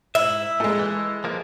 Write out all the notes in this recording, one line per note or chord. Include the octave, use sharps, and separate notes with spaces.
G#2 E4 E5
A#2 G#3 A3
E3
F3 A#3